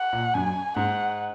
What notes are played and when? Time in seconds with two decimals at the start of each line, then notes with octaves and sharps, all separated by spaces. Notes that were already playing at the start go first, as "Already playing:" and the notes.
Already playing: F#5
0.13 A#2
0.34 F#2 G#5
0.76 G#2 F#5